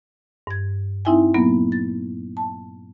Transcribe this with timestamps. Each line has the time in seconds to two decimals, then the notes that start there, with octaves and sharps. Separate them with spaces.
0.47 G2 G#6
1.05 C4 D#4 E4 E5 G5 G#5
1.34 A#2 F#3 A#3 B3
1.72 A6
2.37 A5